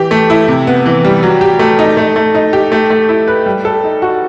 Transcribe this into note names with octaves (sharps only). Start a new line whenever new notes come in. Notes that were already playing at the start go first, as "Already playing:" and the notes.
Already playing: E3 G4
A3
E4
C3
B3
E3
G3
F#3
G4
A3
D#4
A3
A3
D#4
G4
A3
A3
E4
B4
G3
A4
D#4
F#4